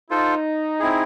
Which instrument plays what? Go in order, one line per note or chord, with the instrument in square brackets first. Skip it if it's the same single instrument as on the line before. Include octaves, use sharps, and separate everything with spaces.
[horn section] D#4 [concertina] F4 A4 C5
[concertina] C4 E4 G#4